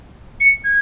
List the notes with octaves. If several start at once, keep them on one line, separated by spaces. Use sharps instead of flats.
C#7
G#6